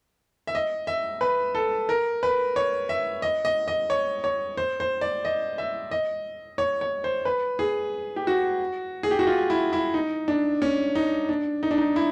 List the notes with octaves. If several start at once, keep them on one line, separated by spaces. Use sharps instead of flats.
E5
D#5
E5
B4
A4
A#4
B4
C#5
E5
D#5
D#5
D#5
C#5
C#5
C5
C5
D5
D#5
E5
D#5
C#5
C#5
C5
B4
G#4
G4
F#4
G#4
G4
F#4
F4
E4
E4
D#4
D4
C#4
D#4
D4
D#4
D4
D#4
E4